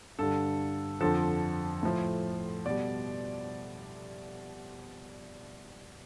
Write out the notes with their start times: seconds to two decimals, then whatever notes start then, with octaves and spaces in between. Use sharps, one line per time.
0.19 G2 D3 G3 A4
1.01 F2 D3 F3 A4
1.83 A2 F3
2.66 B2 G3 D5